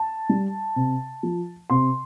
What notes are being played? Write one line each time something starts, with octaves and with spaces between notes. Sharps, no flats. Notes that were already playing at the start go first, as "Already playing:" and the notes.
Already playing: A5
G3
C3
F3
C3 C6